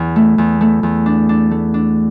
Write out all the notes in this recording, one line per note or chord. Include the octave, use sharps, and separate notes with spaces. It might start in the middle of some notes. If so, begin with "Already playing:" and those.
Already playing: E2
A3
E2
A3
E2
D4
D4
A3
D4